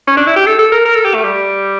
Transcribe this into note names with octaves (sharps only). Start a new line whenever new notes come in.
C#4
D4
E4
G4
A4
A4
A#4
A#4
A4
G4
A3
G3